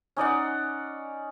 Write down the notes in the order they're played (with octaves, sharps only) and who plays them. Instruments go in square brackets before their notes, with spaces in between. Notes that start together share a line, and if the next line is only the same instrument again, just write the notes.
[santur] C#4 D#4 D5 F#5